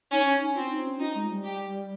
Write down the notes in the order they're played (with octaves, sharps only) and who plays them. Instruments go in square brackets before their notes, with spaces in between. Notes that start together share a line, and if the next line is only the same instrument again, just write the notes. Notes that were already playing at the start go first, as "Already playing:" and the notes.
[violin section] C#4 [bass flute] D#4
[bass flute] C#4
D#4
[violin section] C4 [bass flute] F4
[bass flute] D#4
C#4
[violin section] D#4 [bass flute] F4
[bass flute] G#3
G3
[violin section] G4